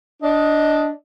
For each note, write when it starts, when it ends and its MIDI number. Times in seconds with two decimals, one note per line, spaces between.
0.23 0.87 62
0.23 0.87 75